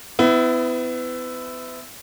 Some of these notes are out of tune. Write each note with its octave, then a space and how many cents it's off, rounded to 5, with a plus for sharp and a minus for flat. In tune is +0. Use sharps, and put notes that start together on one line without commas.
B3 +35 E4 +0